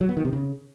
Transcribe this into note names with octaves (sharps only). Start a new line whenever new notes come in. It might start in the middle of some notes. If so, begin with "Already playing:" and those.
F#3
B3
D#3
C3
C#3